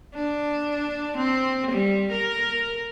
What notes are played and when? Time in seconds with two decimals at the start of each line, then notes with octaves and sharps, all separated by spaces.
0.15 D4
1.17 C4
1.71 G3
2.12 A#4